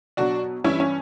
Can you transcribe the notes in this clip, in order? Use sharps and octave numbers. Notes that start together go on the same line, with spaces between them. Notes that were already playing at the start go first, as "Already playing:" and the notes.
B2 F#3 D4 F#4
G2 E3 G3 C#4 E4
C#4